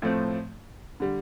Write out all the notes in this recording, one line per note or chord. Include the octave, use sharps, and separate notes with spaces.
A2 F3 A3 C4
D3 G3